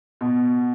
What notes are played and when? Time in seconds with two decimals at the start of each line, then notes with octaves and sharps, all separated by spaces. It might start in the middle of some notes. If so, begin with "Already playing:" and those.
0.21 B2